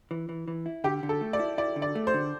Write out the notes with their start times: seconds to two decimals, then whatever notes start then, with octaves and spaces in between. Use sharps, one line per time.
0.11 E3
0.29 E3
0.48 E3
0.66 E4
0.84 D3 G4
1.03 D3
1.09 A4
1.21 A3
1.33 D5
1.39 E4
1.58 E4 D5
1.76 D3
1.82 D5
1.95 A3
2.07 C5
2.14 D3